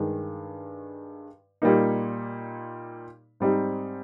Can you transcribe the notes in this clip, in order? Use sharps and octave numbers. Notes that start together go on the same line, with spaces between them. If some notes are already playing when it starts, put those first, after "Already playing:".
Already playing: G2 D#3 G#3
A#2 G3 A#3 D#4
G#2 G3 C4 D#4